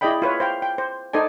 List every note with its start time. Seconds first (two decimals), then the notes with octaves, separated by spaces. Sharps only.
0.01 E4 G#4 D5 D#5 G5 B5
0.22 F4 B4 C#5
0.40 C5 F5 G5
0.62 G5
0.78 C5
1.13 D#4 A4 C5 D5 G#5